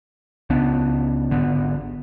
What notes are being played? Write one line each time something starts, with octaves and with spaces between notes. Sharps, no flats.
C#2 C#3 B3 D4
G#1 D3 B3